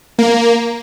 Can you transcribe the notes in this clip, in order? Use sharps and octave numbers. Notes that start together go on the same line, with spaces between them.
A#3